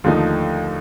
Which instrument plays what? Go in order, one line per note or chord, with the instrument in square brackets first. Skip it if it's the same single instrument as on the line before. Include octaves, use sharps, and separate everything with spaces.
[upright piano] D#2 D3 F3 A3 D#4